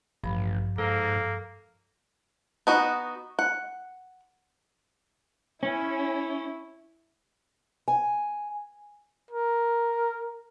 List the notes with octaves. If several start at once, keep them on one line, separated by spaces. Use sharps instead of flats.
A1 G2 F3 B5
G#2 A#3 A4
B3 D#4 F#4
F#5
C#4 E4
G#5
A#4